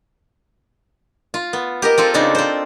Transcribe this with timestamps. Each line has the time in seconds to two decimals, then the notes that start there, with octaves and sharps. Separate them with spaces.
1.34 F4
1.53 B3
1.82 G4 A#4 D#5
1.98 C4 F4 A4
2.14 C#3 C4 D4 D#4
2.35 C4 C5